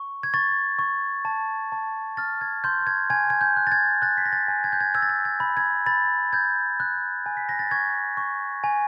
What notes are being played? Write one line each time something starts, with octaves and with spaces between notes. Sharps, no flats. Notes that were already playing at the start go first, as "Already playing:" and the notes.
Already playing: C#6
G#6
C#6 A6
C#6
A5
A5
F6 A6
G#6
C6 G6
G#6
G#5 G#6
G#6
G6
F#6
A6
G#6
F#6 A6
B6
A#6
A6
G#5
G#6
G6
G#6
E6 G#6
A6
G#6
G#6
B5
G#6
B5 A6
G6 G#6
F#6
G#5
B6
A#6
A6
C#6 G#6
C#6
G#5